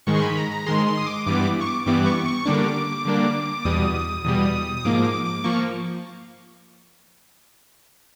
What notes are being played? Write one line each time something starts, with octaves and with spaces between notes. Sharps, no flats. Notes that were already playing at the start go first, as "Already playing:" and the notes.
G#2 D#3 G#3 C#6
C6
B5
A#5
A#5
G#2 D#3 G#3 C6
C6
D#6
D6
G2 E3 G3 B3 D6
C#6
D6
G2 E3 G3 B3 D6
C#6
C#6
D3 G3 A#3 D4 D6
D3 G3 A#3 D4
E2 B2 G3 D#6
E2 B2 G3
D#6
G#2 F3 A#3 D6
D6
D6
F3 A#3 C#6